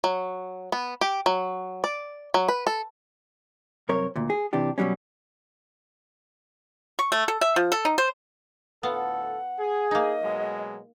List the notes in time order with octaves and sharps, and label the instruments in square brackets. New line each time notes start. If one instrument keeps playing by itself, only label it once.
[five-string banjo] F#3
B3
G4
F#3
D5
F#3
B4
A4
[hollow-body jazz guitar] C2 F#2 C4 A#4 C#5
D2 A#2
G#4
C3 E3 D4 G4
B2 D3 F#3 G3 C#4
[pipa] C#6
A3
A4
E5
F3
A4
D#4
C5
[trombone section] D2 A2 A4 [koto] B3 F4 [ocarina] F#5
[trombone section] G#4
[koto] A#3 D#4 [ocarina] D#5
[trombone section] B2 F#3 G#3